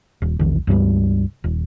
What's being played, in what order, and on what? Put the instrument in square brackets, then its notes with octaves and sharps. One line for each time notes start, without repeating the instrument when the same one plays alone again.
[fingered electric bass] D#1
E1 A#1 D#3
C#2 G2 G3 B3
D#1